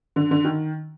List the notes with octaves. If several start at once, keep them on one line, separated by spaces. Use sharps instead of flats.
D3
D3
D#3